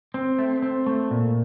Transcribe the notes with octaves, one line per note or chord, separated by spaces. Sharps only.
C4
A3
C4
A3
A#2